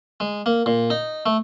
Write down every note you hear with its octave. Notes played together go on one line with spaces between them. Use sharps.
G#3
A#3
A#2
D#4
A3